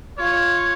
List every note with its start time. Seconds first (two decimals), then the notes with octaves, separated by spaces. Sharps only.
0.18 F4 C#5